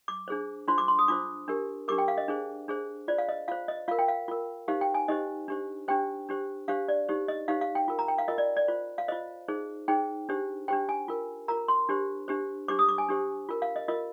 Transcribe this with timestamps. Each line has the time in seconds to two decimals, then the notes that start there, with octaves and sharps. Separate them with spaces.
0.08 D6
0.28 D4 G#4 C5
0.68 D4 F4 C5 C6
0.78 D6
0.88 C6
0.99 D#6
1.08 D4 F4 C5 D6
1.48 D4 G4 A#4
1.88 D4 G4 A#4 D6
1.98 G5
2.08 F5
2.18 D#5
2.28 D4 G#4 C5
2.68 D4 G#4 C5
3.08 F4 C5 D5
3.18 F5
3.29 D#5
3.48 F4 C5 F5
3.68 D#5
3.88 F4 A#4 F5
3.99 G5
4.08 F5
4.28 F4 A#4
4.68 D#4 G4 C5 F5
4.81 G5
4.94 G#5
5.08 D#4 G4 C5 D#5
5.48 D4 G4 C5
5.88 D4 G4 C5 G5
6.29 D4 G4 C5
6.68 D4 G4 C5 F5
6.88 D5
7.09 D#4 G4 C5
7.28 D#5
7.48 D#4 G4 C5 F5
7.61 F5
7.75 G5
7.88 F4 A#4
7.99 A#5
8.08 G5
8.18 F5
8.28 F4 A#4 D#5
8.38 D5
8.56 D5
8.68 F4 C5
8.98 F5
9.08 F4 C5 D#5
9.48 D#4 G#4 C5
9.88 D#4 G#4 C5 G5
10.29 D4 G4 C5
10.68 D4 G4 C5 G5
10.89 G#5
11.08 F4 A#4
11.48 F4 A#4 A#5
11.68 C6
11.89 D4 G4 C5
12.28 D4 G4 C5
12.68 D4 G4 C5 D6
12.79 D#6
12.88 D6
12.98 G#5
13.08 D4 G4 C5
13.49 F4 A#4
13.62 F5
13.76 D#5
13.88 F4 A#4 D#5